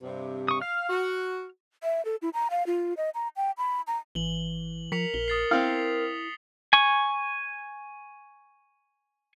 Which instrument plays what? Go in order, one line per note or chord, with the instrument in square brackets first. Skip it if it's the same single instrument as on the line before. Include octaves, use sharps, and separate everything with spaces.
[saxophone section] G2 C3
[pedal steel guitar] C#6 D#6
[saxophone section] F5 [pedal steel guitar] F6
[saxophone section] F#4
[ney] E5
A4
E4
A#5
F5
F4
D#5
A#5
G5
B5
A#5
[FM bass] G#1 [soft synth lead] E3 [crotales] F#7 G7
[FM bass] F3 [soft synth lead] A#4 [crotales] B6 C#7 F7
[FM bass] A#1 [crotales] G7
[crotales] D#6 A6 C7
[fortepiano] C4 F5 [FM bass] E4
[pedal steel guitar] G#5 C#6